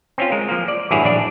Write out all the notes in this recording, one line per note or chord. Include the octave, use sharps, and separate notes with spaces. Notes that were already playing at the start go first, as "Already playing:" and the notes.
C4 C#4 F4
G#3 A#4
F3 A#3
D5
A1 G2 E4 F#4 G#4 C#5
A#1 D4 D5